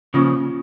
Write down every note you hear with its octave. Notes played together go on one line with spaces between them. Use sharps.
C#3 F3 A#3 C#4 F4